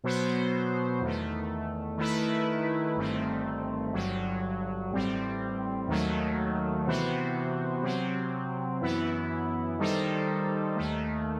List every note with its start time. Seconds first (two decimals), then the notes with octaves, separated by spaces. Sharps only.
0.04 B2 F#3 B3 F#4 C5
1.01 E2 D#3 A3
1.98 D#3 A3 E4 B4
2.96 G1 G2 D#3 A3 C4
3.93 G1 G2 F#3
4.91 A1 A2 G3 C4
5.88 D#2 D#3 F#3 A3
6.86 C3 E3 B3 F#4 C5
7.83 C3 F#3 C4
8.81 F#2 E3 B3 E4
9.78 D#3 G3 D#4 A4 C5
10.76 D#2 D#3 A3